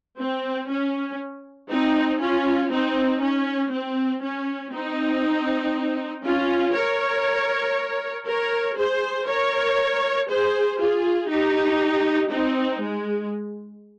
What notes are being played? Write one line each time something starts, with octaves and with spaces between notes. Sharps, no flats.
C4
C#4
C4 D#4
C#4 F4
C4 D#4
C#4
C4
C#4
C4 D#4
C#4 F4
A#4 C#5
A#4 C#5
G#4 C5
A#4 C#5
G#4 C5
F4 G#4
D#4 G4
C4 D#4
G#3